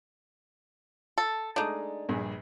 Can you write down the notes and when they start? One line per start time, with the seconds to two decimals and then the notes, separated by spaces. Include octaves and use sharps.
1.18 A4
1.56 G#3 A3 D4 D#4 D#6
2.09 A#1 G2 G#4